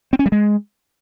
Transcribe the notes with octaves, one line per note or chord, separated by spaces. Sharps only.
C4
C#4
G3
G#3